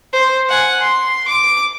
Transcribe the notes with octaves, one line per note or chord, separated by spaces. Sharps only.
C5
F#5 G#5
C6
D6